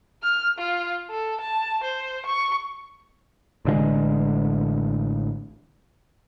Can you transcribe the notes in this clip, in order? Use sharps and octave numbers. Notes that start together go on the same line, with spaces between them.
F6
F4
A4
A5
C5
C#6
A1 D3 F3 G#3